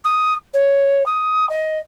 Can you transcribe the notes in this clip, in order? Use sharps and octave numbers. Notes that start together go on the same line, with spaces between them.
D#6
C#5
D#6
D#5